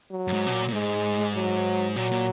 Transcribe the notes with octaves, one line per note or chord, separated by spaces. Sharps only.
F#3
F#2
G#2
B2
A#2
A#2
G#2 G#3
F#3
A#2 F#3
A#2